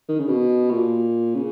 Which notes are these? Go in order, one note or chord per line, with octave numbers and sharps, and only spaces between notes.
D#3
C#3
B2
A#2
C#3